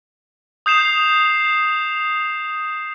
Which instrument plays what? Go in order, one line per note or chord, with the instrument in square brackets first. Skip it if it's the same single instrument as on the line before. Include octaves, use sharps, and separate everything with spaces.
[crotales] D#6 G6 C7 E7 F7